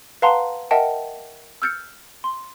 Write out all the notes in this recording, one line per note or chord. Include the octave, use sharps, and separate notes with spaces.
B4 F5 F#5 A5 A#5 C6
A#4 D#5 E5 F#5 G5 A5
E6 F6 G6 A6 C#7
C6